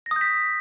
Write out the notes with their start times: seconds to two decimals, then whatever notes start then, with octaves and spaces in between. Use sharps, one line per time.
0.06 A#6
0.11 D#6
0.16 G6
0.21 B6